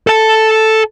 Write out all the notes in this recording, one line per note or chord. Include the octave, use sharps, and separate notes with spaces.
A4 A5